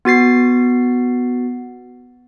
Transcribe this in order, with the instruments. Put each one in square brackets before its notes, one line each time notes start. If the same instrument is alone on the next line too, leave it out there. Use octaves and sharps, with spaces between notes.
[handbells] B3 F#4 A6 C7